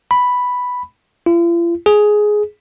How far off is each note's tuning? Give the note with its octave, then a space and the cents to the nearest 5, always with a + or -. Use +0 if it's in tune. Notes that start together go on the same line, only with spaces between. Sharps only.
B5 +0
F4 -45
G#4 +10